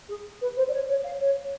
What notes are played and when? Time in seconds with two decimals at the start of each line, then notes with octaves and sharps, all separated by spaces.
0.08 G#4
0.41 B4
0.57 C5
0.67 D5
0.73 C#5
0.89 C#5
1.04 F5
1.20 C#5